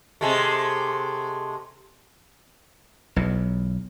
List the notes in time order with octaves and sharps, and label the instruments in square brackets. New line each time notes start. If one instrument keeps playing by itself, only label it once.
[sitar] C3 G#3 A3
[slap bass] B1 E2